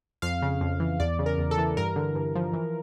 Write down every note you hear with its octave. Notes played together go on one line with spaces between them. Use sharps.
F2 F5
C#3
F2
E3
E2 D5
C#3
A#4
E2
A4
E3
G2 A#4
D3
G2
F3
E3